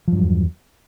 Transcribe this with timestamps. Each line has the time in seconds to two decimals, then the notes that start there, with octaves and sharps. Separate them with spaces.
0.08 F3
0.12 G2
0.17 F#3
0.22 E2